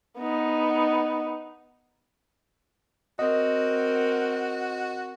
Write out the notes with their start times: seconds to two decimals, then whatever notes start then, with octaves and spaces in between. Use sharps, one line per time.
0.18 B3 D#4
3.19 C4 F#4 A#4 D#5